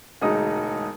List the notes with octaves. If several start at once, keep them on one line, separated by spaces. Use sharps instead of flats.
E1 D2 G#3 D#4 D#6